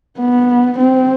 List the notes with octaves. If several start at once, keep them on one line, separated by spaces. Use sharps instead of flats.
B3
C4